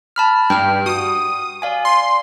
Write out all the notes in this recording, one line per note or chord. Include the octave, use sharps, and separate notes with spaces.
A5 B5 F6
G2 G5 F6
F#4 D#6
D5 F5 G#5
C6